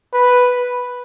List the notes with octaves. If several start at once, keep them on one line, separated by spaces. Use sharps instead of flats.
B4